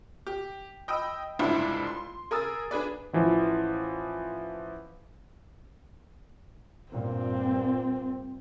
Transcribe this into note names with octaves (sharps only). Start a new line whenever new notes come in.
G4
D#5 G5 B5 D#6 E6
F1 C#2 G2 D4 E4 C5
C6
G#4 A#4 D#6 E6 A6
D4 G#4 B4 D5
A1 E3 F3
G2 A#2 C4